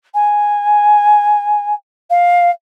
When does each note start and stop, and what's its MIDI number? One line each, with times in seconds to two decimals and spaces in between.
0.14 1.74 80
2.10 2.50 77